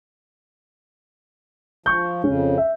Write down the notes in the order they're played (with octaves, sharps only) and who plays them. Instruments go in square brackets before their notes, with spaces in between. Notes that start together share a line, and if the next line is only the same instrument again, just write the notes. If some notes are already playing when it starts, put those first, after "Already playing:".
[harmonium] F3 [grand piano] C#6 G6
[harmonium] F2 C#3 [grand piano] C#4
[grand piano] E5